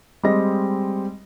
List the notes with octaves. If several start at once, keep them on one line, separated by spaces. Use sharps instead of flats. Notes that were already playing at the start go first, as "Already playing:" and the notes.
G3 G#3 C4 D#5 A#6